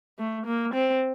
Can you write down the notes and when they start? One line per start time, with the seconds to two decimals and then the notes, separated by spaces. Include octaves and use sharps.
0.19 A3
0.46 A#3
0.74 C4